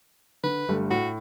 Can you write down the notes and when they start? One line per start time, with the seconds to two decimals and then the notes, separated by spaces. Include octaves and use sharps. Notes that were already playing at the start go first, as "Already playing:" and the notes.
0.43 D3 B4
0.69 G1 G3 A3
0.91 A2 F#4